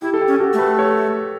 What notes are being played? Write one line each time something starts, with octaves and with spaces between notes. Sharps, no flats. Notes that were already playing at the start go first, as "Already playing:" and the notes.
E4 G4
A4
G4
C#4
G4
F#4 A4
A3
G4 B4
A4 C#5